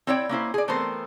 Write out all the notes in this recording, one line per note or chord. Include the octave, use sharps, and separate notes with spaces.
C4 E4 C#5 D5 F5 G5
A#3 C#4 E4 C5
G#4 D5
E3 A3 B3 C4 A#4 C5